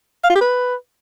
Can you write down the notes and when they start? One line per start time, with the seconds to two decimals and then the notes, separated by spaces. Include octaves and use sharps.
0.24 F5
0.30 F4
0.35 G4
0.41 B4